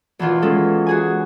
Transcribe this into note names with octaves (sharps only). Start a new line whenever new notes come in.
E2 B2 D#3 F4
G#3 C#4 A4
F#4 G#4 G#5